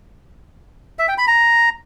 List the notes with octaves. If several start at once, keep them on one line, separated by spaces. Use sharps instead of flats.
E5
G5
B5
A#5